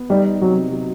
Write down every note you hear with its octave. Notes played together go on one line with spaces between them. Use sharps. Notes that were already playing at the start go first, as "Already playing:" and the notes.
Already playing: B3
G3 D#4
C3 F#3
F#3